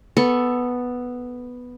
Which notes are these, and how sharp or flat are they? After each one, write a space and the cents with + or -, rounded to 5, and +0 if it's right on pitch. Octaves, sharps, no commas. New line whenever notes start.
B3 +0 A4 +0 C#6 +0